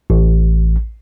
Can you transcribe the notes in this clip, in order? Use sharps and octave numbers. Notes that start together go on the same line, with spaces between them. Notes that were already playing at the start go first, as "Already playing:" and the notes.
A1